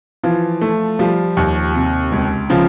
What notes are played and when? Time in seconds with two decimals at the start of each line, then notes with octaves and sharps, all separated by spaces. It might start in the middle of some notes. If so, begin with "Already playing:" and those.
0.23 E3 F3 F4
0.61 A3
0.99 F3 G3 F4
1.37 D#2
1.74 C3
2.12 C#2
2.50 C#3 F3 F4